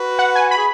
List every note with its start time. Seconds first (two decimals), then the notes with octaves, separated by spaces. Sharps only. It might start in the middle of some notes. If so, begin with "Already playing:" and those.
Already playing: F#4 B4
0.19 F#5
0.35 G#5
0.51 B5
0.57 G#4